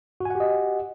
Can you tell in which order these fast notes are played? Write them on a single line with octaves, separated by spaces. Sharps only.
F#4 G#5 F#5 G4 D#5